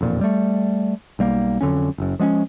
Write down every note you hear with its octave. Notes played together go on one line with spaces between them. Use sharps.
E1 F2 A#2
G3 A3
B1 G3 A#3
F2 D3 F#3 C#4
F#1 F#2
F3 G#3 B3 C#4